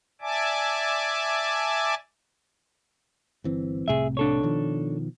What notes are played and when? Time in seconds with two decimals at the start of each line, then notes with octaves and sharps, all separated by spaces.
0.21 D5 E5 G#5 A5 D6
3.44 G1 E3 C4
3.88 C2 A2 C3 G#4 E5
4.17 D4 A4 C#5
4.43 B2 D#3 F3